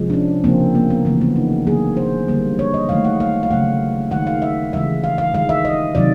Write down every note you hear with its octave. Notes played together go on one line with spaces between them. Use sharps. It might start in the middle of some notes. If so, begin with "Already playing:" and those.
Already playing: C3 F3 G#3
D4
C#4
C#3 F3 A#3 C4
A#3
B3
C#3 E3 A3 B3
B3
D#4
D3 F#3 A#3 G#4
C5
D3 G3 A#3
C#5
D#5
D#3 F#3 A3 F5
F#5
F5
F5
C#3 F#3 A3 F#5
D#3 G#3 F#5
F5
E5
C#3 E3 G#3 E5
F5
F5
D#3 G#3 F5
E5
D#5
C3 D#3 F#3 D5